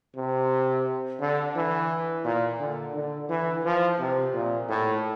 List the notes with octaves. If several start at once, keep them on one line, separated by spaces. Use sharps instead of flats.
C3
D3
E3
A#2
D3
D3
E3
F3
C3
A#2
A2